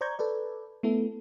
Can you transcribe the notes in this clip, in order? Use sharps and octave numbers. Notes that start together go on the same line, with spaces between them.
C5 D5 A#5 C#6 G6 G#6
A4 B4 D5
A3 B3 E4 A4